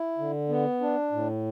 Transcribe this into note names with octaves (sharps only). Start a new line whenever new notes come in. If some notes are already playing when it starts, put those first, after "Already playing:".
Already playing: E4
D3
B3
D4
A2